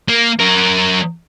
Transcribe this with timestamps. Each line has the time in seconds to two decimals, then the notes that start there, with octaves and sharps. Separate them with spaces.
0.09 A#3
0.40 F#3 A#4